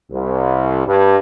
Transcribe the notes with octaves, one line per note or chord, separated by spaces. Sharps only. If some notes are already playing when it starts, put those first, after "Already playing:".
C2
G2